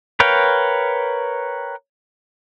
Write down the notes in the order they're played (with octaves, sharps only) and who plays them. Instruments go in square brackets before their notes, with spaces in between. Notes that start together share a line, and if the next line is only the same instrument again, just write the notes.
[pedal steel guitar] A#4 B4 C#5 F5 G5